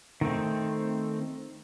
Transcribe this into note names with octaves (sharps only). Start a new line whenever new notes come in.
D#3 A3 C4